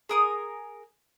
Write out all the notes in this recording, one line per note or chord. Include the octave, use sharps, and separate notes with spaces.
G#4 A#4 D#6